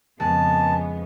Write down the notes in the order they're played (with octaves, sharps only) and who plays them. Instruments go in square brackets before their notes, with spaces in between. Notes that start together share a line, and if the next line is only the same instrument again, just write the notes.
[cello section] F2 C#3 B3 [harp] G#3 [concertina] A5